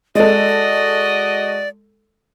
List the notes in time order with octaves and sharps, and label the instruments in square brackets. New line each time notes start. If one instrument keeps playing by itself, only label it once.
[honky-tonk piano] G#3 A4 [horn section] F#4 D#5 [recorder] D5